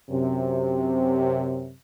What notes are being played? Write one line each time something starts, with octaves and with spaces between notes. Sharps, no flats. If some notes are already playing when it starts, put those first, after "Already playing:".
F#2 C3